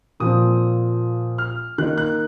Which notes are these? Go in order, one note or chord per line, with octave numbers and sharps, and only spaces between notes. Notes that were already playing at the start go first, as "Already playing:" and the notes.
A#2 F3 C4 D#6
F6
D#3 A#3 D#4 F#6
F#6